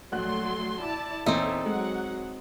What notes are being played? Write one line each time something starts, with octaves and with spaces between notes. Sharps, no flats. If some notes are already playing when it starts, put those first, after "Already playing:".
A#1 F#3 A3 F#4 C6 F#6
E4 D5 A5
E2 A#2 C4 D#4 A4 C#5 E5
F#3 G#3 F#5